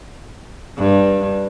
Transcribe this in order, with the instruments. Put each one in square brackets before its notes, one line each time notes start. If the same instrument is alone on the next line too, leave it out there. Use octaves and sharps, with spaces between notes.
[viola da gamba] G2